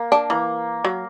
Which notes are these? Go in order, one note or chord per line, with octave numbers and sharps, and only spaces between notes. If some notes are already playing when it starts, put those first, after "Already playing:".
Already playing: A#3
D4
E3 A#3
F#3